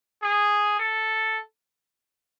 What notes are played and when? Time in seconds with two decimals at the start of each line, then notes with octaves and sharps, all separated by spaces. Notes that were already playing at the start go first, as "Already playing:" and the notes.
0.23 G#4
0.79 A4